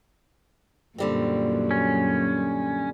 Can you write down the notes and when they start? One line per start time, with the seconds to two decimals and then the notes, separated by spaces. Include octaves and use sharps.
0.98 F#2 A#2 D3 F#3 G3 C4
1.71 C#4